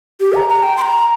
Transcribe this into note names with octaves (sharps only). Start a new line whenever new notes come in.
G4
A#5
A#5
G5
C6
A#5